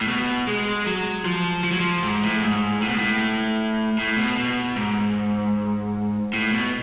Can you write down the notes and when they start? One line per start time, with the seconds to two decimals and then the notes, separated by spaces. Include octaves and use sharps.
0.01 A2
0.08 B2
0.47 G#3
0.87 F#3
1.25 F3
1.64 F3
1.71 F#3
1.80 F3
2.03 G#2
2.23 A2
2.43 G#2
2.81 A2
2.89 B2
2.98 A2
3.99 A2
4.18 B2
4.37 B2
4.76 G#2
6.34 A2
6.53 B2